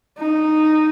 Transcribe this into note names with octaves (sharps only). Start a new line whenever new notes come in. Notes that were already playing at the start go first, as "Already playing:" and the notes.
D#4